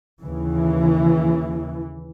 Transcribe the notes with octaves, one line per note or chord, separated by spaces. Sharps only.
D#2 C#3 E3